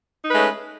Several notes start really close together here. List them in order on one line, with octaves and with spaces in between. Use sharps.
D#4 B4 A3 G#3 C#4